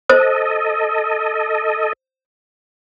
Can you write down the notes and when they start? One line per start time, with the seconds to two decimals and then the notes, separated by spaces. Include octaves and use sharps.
0.10 A4 C5 D#5